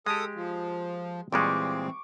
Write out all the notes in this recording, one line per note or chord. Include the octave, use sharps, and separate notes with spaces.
G#3 G4 A4 D#6
F3
A#2 E3 G3 G#3 C4 C#6 D6